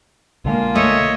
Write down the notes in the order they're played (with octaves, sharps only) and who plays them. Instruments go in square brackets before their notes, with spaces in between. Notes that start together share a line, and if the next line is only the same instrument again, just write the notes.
[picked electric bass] B1 D3 G#3 [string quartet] A#3 F4
[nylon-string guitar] A3 [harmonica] C#5 D#5 E5